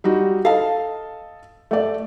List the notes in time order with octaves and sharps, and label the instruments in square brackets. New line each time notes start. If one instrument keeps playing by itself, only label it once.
[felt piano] G3 D#4 F#4
[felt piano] A4 D#5 A5 [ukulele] F5
[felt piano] A3 D5